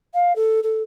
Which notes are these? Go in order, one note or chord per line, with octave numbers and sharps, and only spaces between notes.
F5
A4
A4